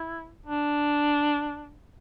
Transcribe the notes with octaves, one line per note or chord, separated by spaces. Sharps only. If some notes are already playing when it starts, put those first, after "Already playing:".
Already playing: E4
D4